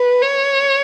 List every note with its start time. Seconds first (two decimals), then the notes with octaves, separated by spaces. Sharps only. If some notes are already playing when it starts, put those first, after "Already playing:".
Already playing: B4
0.22 C#5